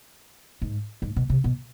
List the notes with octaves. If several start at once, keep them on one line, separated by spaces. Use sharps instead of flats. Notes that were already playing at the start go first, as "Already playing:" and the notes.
G#2
G#2
B2
C3
B2